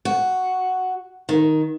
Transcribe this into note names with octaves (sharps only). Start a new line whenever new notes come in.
F#4
D#3